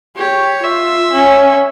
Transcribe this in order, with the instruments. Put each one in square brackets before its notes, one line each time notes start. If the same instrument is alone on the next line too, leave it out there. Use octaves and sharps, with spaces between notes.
[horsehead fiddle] G4 [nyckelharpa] C#5
[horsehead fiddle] F4 [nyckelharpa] E5
[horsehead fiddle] C#4